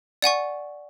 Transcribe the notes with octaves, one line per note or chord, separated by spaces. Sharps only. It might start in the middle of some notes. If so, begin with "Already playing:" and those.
D5 F#5 G#5 C#6